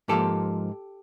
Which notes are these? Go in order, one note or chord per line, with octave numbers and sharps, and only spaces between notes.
G#2 F3 A#3 G4 A4